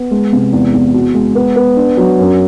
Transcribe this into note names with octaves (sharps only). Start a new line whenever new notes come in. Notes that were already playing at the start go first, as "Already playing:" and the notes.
Already playing: B3
G#3
C3
E2
E2
F#4
G#3
B3
B3
D4
F#3
F#2